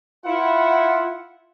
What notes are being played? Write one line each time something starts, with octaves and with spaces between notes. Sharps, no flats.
E4 F4 F#5